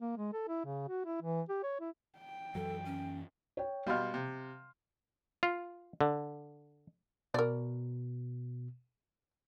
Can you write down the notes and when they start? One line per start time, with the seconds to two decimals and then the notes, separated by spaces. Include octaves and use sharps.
0.01 A#3
0.17 G#3
0.33 A4
0.48 E4
0.65 C#3
0.88 F#4
1.05 E4
1.22 E3
1.49 G4
1.63 C#5
1.80 E4
2.18 G5
2.55 F#2 E3 F#3 A4
2.85 C#4
3.57 C#5 G5
3.86 B2 G3 F5 C6 F6
4.14 C3
5.43 F4
6.01 D3
7.34 B2 A#4 D5